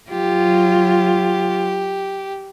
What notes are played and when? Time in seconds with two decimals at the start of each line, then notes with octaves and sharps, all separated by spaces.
0.11 F#3 F4 G4